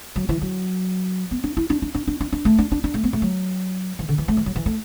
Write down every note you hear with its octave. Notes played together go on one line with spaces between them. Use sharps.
F#3
E3
F#3
B3
D4
E4
D4
D4
D4
D4
D4
D4
A3
D4
D4
D4
A3
B3
A3
F#3
E3
D3
E3
A3
E3
F#3
E3
A3